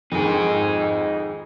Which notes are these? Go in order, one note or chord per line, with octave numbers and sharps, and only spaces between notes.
F2 D#3 D#4 G#4